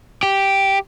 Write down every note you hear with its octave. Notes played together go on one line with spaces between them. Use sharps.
G4